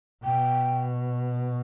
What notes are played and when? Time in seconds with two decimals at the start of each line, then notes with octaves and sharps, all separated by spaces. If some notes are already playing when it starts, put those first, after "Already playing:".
0.23 B2 G5